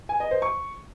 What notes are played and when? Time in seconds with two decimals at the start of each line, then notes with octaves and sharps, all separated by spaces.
0.09 G#5
0.20 D#5
0.31 C5
0.42 C#6